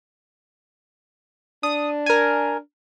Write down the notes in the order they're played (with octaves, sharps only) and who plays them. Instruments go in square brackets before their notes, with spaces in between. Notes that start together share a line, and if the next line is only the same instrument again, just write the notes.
[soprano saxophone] D4 [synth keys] D#6
[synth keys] A#4 G#5